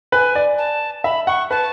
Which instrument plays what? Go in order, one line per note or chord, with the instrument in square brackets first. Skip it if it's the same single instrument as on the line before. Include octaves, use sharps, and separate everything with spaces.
[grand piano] B4 [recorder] G#5
[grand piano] D5
[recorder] A5
[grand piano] E5 [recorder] B5
[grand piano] F#5 [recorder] C#6
[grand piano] B4 [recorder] A5